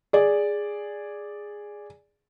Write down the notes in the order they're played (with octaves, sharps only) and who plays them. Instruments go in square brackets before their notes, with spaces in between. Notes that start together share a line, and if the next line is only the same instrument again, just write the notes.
[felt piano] G#4 D5